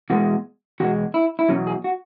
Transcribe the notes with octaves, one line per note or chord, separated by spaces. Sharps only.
E2 B2 G#3 F#4
E2 B2 G#3 F#4
E4
E4
E2 B2 F#3 C#4
G#4
F#4